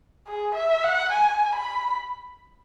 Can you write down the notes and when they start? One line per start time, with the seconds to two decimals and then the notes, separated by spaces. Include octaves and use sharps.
0.28 G#4
0.55 E5
0.84 F#5
1.12 G#5
1.55 B5